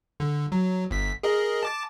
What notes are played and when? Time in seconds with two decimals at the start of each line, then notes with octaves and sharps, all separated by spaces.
0.20 D3
0.52 F#3
0.91 G1 B6
1.23 G#4 A#4 D#5
1.63 A5 D6 A6